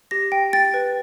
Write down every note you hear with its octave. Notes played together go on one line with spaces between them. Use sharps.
G4 A#6
G5
G5 A6
B4